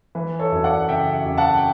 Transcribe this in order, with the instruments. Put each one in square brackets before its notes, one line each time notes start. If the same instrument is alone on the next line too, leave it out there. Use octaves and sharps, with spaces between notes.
[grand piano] E3 B4
A4 C#5
F#2
D5 F#5
C#3 E5 G5
F#2
F#5 A5
G5